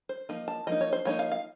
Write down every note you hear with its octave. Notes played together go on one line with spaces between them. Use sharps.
C5
F3 A#3 D#4
A5
F3 A#3 D#4 D#5
C#5
C5
F3 A#3 D#4 C#5
F5
F5